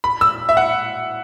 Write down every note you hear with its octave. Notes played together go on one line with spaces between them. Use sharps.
B5
E6
E5
F#5